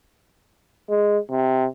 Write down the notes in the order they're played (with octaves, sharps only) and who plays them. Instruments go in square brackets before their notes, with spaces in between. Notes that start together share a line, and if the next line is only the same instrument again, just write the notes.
[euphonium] G#3
C3